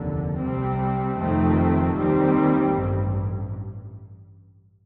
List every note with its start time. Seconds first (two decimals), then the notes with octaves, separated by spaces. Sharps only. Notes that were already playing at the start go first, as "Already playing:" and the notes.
Already playing: F1 D#2 D3
0.39 C2 C3 G3 C4
1.16 F1 F2 D#3 A3 C4
1.94 D#2 D#3 G3 C4
2.72 A1 G2